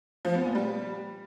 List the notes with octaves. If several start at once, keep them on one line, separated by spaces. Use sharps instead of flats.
F3
B3
A#2
G3